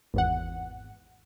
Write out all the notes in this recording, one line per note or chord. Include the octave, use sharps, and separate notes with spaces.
G#1 E2 F#5